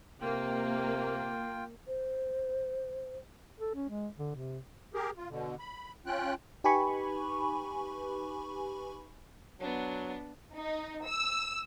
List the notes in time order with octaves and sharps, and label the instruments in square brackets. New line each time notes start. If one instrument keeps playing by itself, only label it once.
[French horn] C3 [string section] A#3 [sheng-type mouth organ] F4 G5
[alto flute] C5
[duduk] A4
C#4
G#3
D3
C3
[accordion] G4 G#4 A#4
F4
B2 D3
B5
C#4 F4 G5 F#6
[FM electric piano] D#4 G4 B4 G#5 B5 C#6
[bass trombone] F#3 [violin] B3 D4
[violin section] D#4
E6